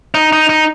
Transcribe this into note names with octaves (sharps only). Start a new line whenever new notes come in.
D#4
D#4
D#4